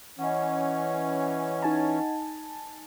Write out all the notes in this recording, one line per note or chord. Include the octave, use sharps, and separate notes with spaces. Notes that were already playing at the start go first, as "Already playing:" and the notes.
E3 C#4 D#5 F#5
D#4 G#5 A5